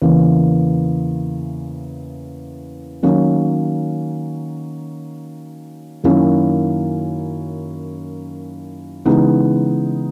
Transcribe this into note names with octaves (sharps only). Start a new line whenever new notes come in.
E2 C#3 E3 A#3
D#3 F#3 A#3 C#4
F#2 D#3 A#3 C#4 E4
C#3 E3 G#3 B3 D#4